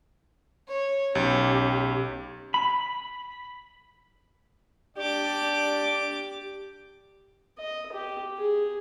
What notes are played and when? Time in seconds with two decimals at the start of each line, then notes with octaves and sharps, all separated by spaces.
0.68 C#5
1.15 B1 C#4 G4
2.54 B5
4.97 D4 G4 D5 D6
7.58 D#5
7.93 G4
8.38 G#4